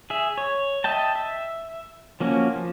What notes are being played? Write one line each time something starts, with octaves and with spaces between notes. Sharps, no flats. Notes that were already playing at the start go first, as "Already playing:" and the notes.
G#4 E5
C#5
D#5 E5 G5 A5
E5
F3 A#3 C#4 F#4
F3